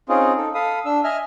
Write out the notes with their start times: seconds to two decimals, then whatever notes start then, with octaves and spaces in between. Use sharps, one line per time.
0.09 C4 C#4 D#4 F4 G#4
0.37 D#4 A4
0.55 A4 F5 B5 D#6
0.85 D4 E6
1.04 D#5 E5 G#5 F6